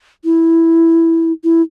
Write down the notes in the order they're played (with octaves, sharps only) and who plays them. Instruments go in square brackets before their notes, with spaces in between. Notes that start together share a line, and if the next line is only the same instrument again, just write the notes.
[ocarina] E4
E4